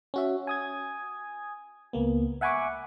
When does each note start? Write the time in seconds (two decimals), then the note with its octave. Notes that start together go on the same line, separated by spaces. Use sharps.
0.14 C#4 F#4 E5
0.47 G#5 D#6 G#6
1.93 C#2 A#3 B3
2.41 E5 F#5 G#5 B5 C#6 D6